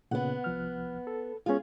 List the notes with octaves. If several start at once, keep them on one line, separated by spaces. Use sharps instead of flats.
A#2 C#3 B3 F#5
C2 F3 F6
A4
G#3 B3 C#4 F4 G#4